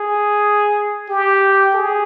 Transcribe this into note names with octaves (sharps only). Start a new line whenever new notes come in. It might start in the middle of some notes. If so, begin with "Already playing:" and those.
Already playing: G#4
G4
G#4